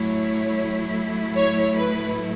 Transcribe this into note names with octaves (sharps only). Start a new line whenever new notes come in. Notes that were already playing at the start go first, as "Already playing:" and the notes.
Already playing: A2 F#3 A3 E4 C#5
C#5
B4